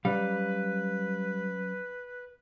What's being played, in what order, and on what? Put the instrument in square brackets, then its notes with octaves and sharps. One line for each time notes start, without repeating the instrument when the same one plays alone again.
[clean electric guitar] F#3 C#4 F5 [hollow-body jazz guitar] G3 [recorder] B4